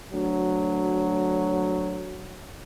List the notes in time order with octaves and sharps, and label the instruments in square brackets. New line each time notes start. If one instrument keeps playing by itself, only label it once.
[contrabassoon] D2 [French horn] F#3